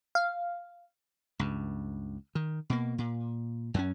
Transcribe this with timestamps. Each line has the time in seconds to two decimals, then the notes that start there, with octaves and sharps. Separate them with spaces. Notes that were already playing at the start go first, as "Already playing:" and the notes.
0.15 F5
1.39 C#2 G2
2.35 D#3
2.70 B2 A#3
2.98 A#2
3.74 F#2 F#3 G3 C#4